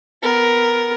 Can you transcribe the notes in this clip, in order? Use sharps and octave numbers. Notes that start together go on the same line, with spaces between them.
B3 A#4